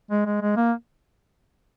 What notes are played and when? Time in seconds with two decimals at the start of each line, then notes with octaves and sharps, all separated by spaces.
0.11 G#3
0.26 G#3
0.42 G#3
0.56 A#3